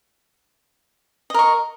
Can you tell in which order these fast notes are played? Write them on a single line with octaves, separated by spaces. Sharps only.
D#5 A#4 C#6